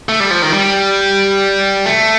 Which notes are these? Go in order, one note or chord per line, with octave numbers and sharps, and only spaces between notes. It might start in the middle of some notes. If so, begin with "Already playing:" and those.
A3
G3
F3
D#3
G3
A3